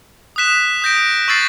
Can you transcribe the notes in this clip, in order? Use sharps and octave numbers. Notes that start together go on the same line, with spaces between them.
D#6 F#6 B6 E7
D#6 G6 A#6 D7
C#6 E6 A6 C7